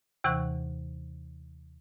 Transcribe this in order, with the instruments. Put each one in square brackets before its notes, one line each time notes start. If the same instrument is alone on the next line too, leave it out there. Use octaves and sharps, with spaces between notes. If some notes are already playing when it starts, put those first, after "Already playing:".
[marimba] D#2 C3 E3 F#5 C#6 F#6